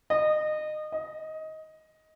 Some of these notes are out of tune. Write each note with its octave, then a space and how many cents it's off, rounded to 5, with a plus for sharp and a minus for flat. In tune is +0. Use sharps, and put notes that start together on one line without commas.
D#5 -25
D#5 +15